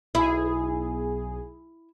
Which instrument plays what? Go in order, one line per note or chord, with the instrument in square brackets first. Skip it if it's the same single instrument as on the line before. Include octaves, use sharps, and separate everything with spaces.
[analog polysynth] B1 G#4 [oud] E4